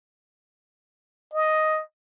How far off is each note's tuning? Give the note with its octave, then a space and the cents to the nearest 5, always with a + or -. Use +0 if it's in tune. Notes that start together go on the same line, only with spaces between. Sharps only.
D#5 +5